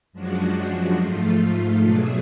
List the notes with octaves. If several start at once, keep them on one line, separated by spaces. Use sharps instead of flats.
F#2 F3 G#3 D4 F#4
G#2 F3 A3 F4
B2 F#3 A3 D4 G#4